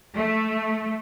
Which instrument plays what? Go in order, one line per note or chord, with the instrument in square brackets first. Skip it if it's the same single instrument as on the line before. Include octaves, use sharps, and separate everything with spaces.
[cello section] A3